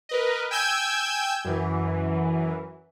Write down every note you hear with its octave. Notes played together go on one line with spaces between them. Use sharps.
A#4 B4 D#5
G5 G#5 E6 G6 G#6
F#2 E3